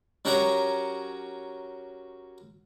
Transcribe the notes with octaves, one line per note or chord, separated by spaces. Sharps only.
F#3 C#4 G4 A#4 F#5 A#5